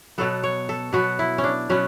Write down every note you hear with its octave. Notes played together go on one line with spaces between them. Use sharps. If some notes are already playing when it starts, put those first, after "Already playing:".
B2 F#3 B3 A4
C#5
A4
B2 F#3 B3 F#4
E4
C#4
D4
B2 F#3 B3 C#4